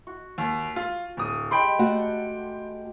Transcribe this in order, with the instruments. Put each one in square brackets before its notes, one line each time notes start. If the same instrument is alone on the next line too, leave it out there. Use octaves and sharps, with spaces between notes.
[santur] F#4
[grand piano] D#2
F4
D1 D#6
[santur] G#3 G4 [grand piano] G5 B5 C6
[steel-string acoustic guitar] A3 F#4 F#5